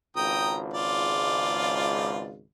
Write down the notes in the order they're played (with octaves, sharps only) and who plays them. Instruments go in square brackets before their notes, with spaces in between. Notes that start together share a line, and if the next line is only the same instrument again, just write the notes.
[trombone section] G#1 C#2 [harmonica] G5 A#5 D#6
[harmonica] F4 D5